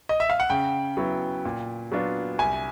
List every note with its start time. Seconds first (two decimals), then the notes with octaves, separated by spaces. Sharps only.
0.09 D#5
0.20 E5
0.30 F5
0.40 F#5
0.50 C#3 G5
0.97 F#3 B3 E4
1.45 A#2
1.92 F#3 B3 D4 F4
2.39 C2 G#5